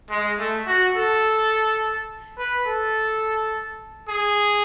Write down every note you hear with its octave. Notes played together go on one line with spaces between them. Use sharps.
G#3
A3
F#4
A4
B4
A4
G#4